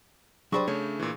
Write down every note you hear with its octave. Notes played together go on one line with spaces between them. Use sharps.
F#3 G3 D4 G#4 C5 C#6
C#3 A3 C#5
A#2 E3